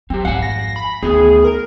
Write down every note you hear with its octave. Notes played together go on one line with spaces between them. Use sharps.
F#3 C4 G4
G#1 F2 F5 F#5 G#5
A#6
B5
D2 D#3 B3 G#4
A#4